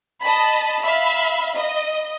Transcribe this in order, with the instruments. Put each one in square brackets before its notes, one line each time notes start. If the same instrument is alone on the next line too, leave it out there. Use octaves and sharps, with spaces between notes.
[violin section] D#5 A5 B5
E5 F5 B5
D#5